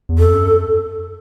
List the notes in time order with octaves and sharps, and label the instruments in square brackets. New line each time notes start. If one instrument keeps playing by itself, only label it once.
[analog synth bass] E2
[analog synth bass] F2 [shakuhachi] A4
[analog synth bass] F#2